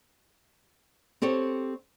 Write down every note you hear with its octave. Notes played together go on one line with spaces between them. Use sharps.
C4 G4 A4 C#5